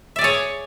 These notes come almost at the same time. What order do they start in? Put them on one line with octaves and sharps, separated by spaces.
E5 D5 G#4 C#5